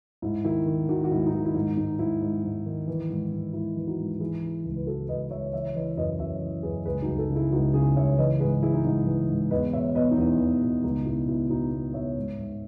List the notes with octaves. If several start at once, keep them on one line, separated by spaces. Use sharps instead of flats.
G#2 E4
D#3 E4
D#3
D#3 D#4 F#4
F#4
G#2 E4
D#4
D#3 E4
E4
G#2 D#4
G#2 D#4
G#2 E4
G#2
G#2
D#3
E3
G#2
G#2
G#2 E4
E3
D#4 F#4
G#2
E3 E4 G#4
E3
C#2
B4
E3 F#4 A4
C#2 B4 D#5
C#2 C#5 E5
E3 C#5 E5
E3 B4 D#5
F#2 B4 D#5
F#2 C#5 E5
E3
F#2 G#4 B4
C#2 G#4 B4
D#4 F#4
C#2
F#4 A4
C#3
E4 G#4
C#2 D#4 F#4
C#3 E4 G#4
C#2 C#5 E5
E3 B4 D#5
G#2 G#4 B4
E3 E4 G#4
D#4
G#2 E4
E3
G#2
E2 B4 D#5
B2 C#5 E5
B2 B4 D#5
D#4
E2 E4
E2
B2
C#2 D#4
B2 E4
B2 E4
B2 D#4 F#4
B2
B2 C#5 E5
G#2
G#2